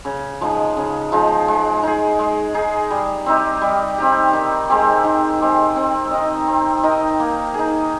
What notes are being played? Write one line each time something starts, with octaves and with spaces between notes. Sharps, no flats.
C#3
F3 G#3 D#4
C#3
F3 G#3 D#4
G#3
D#4 G#4
G#3
D#4 G#4
G3
C4 D#4 G4
G3
C4 D#4 G4
D#3
G#3 C4 G4
D#3
G#3 C4 G4
C4
D#4 A#4 D#5
C4
D#4 A#4 D#5
A#3
D#4 G#4